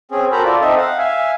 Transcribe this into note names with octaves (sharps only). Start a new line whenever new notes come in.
C4 C#4 G#4
F#4 A4 A#4 C5 A#5 B5
F4 A4 D5
C4 D#4 A4 D#5 E5
F5 F#5
E5 F5 G#5